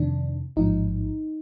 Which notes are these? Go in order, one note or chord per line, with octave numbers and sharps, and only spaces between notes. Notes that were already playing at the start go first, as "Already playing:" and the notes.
Already playing: F2 C3 D#3 D4
A1 G#2 F3 D#4